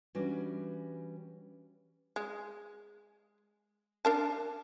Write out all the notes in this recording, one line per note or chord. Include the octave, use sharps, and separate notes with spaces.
E3 G3 C#4 D4 F#4
G#3
D4 A#4 A5